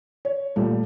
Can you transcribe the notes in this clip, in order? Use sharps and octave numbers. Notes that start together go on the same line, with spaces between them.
C#5
A#2 G3 A3